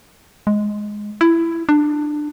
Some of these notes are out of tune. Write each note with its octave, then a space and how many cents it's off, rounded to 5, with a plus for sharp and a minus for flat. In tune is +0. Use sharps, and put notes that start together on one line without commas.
G#3 +5
E4 +15
D4 +20